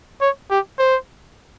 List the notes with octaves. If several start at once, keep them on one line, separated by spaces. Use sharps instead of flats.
C#5
G4
C5